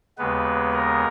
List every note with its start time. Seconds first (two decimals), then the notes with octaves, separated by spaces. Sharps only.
0.18 D#2 C#3 G#3 B3 B4
0.73 A#4